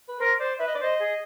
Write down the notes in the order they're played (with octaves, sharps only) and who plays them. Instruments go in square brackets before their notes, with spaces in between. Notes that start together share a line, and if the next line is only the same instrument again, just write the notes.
[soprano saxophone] B4
[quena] A#4 [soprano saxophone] C5
[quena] C5 [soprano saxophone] D5
[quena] B4 [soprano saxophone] E5
[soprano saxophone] D#5
D5
[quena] C5 [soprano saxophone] D#5
[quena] G#4